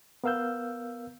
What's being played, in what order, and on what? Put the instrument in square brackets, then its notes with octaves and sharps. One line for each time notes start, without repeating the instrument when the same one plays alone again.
[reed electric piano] B3 A#4 F5 E6 G6